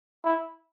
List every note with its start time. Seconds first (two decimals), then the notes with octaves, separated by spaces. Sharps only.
0.25 E4